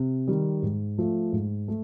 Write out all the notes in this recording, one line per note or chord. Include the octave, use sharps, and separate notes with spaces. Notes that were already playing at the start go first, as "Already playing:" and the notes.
Already playing: C3
D#3 G3
G#2
F3 A3
G#2
A3